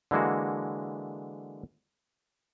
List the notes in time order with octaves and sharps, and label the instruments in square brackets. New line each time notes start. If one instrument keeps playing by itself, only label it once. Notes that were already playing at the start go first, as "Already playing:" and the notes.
[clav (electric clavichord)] D3 E3 G#3 A#3 F#4